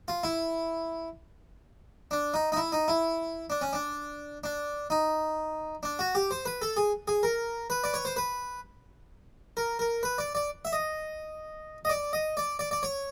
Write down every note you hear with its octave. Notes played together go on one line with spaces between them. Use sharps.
F4
E4
D4
D#4
D#4
E4
D#4
E4
D4
C#4
D4
D4
D#4
D4
F#4
G4
C5
B4
A4
G#4
G#4
A#4
B4
D5
C#5
C5
B4
A#4
A#4
B4
D5
D5
E5
D#5
D#5
D5
D#5
D5
D5
D5
C#5